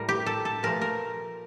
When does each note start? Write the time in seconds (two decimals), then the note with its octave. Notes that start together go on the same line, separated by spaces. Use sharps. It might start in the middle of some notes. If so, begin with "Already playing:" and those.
Already playing: A2 G3 A#4
0.09 G4
0.26 A4
0.45 A4
0.63 A#2 F3 A3 A#4
0.81 A#4